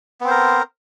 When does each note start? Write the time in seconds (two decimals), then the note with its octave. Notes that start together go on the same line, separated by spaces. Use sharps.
0.21 B3
0.24 C4
0.27 C5
0.31 A#4